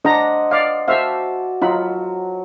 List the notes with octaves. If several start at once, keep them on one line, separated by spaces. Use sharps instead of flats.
D4 C5 D#5 F#5 A#5
D5 F5
F#4 C5 E5 F5 A5 D6
F#3 D#4 F4 B5